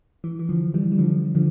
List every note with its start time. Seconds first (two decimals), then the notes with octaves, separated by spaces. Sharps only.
0.24 E3
0.39 E3
0.49 D3 F3
0.74 E3 G3
0.92 G3
0.99 D3 F3
1.35 D3 F3